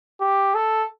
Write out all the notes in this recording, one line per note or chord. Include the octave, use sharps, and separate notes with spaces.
G4
A4